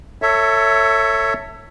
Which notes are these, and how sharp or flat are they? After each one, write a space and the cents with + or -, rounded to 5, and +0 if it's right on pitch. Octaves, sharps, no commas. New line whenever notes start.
A4 +25 C#5 +0 E5 +0